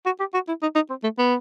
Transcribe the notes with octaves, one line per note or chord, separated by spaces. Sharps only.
F#4
G4
F#4
E4
D#4
D#4
C4
A3
B3